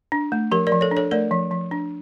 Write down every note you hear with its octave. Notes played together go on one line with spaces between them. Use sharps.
D4
A3
F3 G4 A#4
A#4 D5
F3
A4 C#5
D4
A4 C#5
A3 A#4 D5
F3
F3
D4